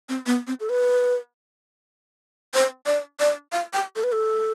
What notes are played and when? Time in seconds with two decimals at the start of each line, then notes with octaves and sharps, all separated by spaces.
0.09 C4
0.26 B3
0.47 C4
0.60 A4
0.69 B4
2.54 C5
2.86 D5
3.20 D5
3.52 F5
3.73 G5
3.96 A4
4.04 B4
4.12 A4